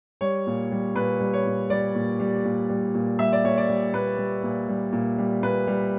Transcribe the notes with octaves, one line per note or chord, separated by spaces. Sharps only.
G3 C#5
A#2
G3
A#2 B4
G3
C#5
A#2
G3 D5
A#2
G3
A#2
G3
A#2
G3 E5
D5
A#2 C#5
D5
G3
A#2 B4
G3
A#2
G3
A#2
G3
A#2 B4
G3